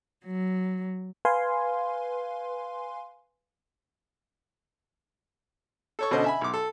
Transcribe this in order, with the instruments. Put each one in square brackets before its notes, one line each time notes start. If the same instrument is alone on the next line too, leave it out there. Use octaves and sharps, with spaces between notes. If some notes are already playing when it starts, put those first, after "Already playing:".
[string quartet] F#3
[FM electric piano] B4 F5 G#5 C6
[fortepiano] A4 C#5 C#6
B2 D3 C#4 C5 D#5
E5 G#5 B5
B1 D6
A4